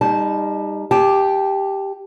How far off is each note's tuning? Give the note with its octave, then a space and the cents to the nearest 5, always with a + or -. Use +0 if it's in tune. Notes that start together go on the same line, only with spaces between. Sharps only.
G3 +30 D#4 +0 A5 -20
G4 +0 A5 -25